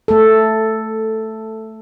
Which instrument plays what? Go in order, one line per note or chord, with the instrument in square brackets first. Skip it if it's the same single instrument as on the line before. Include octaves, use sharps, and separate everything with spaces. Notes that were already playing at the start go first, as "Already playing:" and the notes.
[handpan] A3 A4